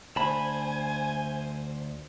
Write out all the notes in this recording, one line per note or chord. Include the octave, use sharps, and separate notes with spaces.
D2 C5 G#5 A5 B5